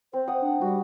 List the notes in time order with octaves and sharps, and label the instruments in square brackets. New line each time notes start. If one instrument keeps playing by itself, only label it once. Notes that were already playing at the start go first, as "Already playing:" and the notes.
[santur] C4 [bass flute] C5
[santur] F#5 D#6
[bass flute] D4
[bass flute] G3 [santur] F#4